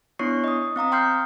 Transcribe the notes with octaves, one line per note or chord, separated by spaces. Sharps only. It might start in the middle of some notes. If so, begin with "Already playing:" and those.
B3 D4 E4 C#5 C#6 C7
D#5 D#6
C4 F5 A#5 D#6
G5 C6 F6 G6 C7